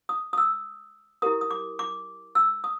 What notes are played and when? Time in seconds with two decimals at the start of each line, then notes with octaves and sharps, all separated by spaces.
0.09 D#6
0.33 D#6
0.38 E6
1.22 E4 G4 A#4 D#6
1.41 D#6
1.51 D6
1.79 D6
2.35 E6
2.64 D#6